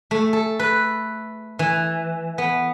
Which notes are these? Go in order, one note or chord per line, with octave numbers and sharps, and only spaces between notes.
A3
A4
B4
E3
B3